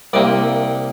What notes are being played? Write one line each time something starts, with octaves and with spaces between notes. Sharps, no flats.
C2 C3 A#3 D5